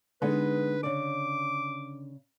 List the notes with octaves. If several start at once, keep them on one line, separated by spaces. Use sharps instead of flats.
D3 G#3 B3 D#4 B4
C#3 D5 D6